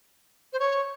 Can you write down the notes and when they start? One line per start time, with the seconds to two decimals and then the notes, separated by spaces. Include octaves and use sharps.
0.53 C5
0.60 C#5